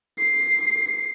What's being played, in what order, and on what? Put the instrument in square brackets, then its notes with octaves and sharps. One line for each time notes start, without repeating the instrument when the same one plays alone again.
[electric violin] C7